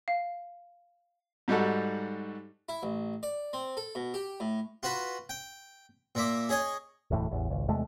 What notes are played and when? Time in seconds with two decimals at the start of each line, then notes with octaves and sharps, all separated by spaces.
0.08 F5
1.48 G#2 G3 D#4 F#4 A4
2.69 E4
2.83 A1
3.23 D5
3.53 C4
3.77 A4
3.95 B2
4.14 G4
4.40 A2
4.83 F4 F#4 B4
5.29 G5
6.15 A#2 A#3 E5 D6
6.49 G#4 C#5 D#5 G#5
7.11 E1 D2 A2 E3
7.31 A1 E2
7.50 G#1 C#2
7.68 E2 C3 G#3 A3